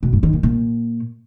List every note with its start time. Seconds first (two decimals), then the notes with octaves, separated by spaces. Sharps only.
0.03 B2
0.13 G2
0.23 D#3
0.33 A#2
0.43 A#2